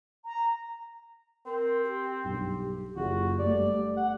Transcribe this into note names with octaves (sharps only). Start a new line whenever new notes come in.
A#5
C4 A#4
G4
B1 G2
F#1 F4 F#4 G#4
G1 A3 D5
F#5